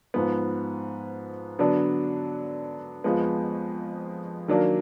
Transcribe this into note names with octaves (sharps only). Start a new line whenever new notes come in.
G#2 F3 B3
D3 F#3 B3 D4
F2 F3 G#3 B3
D#3 F#3 A#3 D4